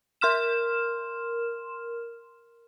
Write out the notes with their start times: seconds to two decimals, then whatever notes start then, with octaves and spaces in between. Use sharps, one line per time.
0.21 A#4 C6 F6 E7